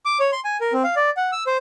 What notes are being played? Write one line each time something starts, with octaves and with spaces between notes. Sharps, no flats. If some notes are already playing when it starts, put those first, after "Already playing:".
D6
C#5
C6
G#5
A#4
C4
F5
D5
F#5
E6
C5